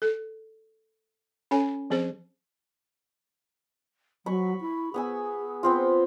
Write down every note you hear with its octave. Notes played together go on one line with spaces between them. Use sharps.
A4
C#4 A4 C#5 G#5
F3 C4 G#4 C5
F#3 B5 C#6
E4
B3 G#4 G#5 E6
B3 C4 F4